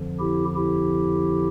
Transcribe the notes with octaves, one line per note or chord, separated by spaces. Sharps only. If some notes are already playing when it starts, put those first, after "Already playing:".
Already playing: F2 D3 F3
E4 G4
E4 G4